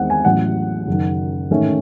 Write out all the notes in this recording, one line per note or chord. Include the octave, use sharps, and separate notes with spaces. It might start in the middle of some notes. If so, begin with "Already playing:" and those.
Already playing: E2 D#3 G#3 C4 F#5
G#5
A1 A2 F#3 F#5
F#1 F#2 D#3
A1 G#2 D#3 A3 C#4